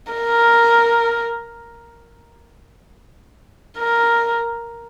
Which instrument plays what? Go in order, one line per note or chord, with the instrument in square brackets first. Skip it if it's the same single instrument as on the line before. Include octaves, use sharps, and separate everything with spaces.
[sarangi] A#4
A#4